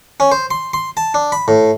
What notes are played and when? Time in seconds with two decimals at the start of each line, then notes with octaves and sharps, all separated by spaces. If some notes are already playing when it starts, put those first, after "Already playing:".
0.20 C#4
0.32 C5
0.51 C6
0.74 C6
0.97 A5
1.14 D4
1.32 B5
1.48 A2